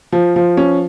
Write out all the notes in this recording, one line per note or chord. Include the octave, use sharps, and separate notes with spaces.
F3
F3
C#4